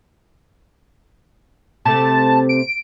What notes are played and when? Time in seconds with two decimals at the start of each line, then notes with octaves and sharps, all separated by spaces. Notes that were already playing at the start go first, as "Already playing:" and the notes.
1.85 C3 A3 A5
2.49 D7